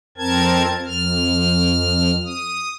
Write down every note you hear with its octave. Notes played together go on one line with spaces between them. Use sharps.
F2 C4 A#4 A5 G#6
F2 F6
D#6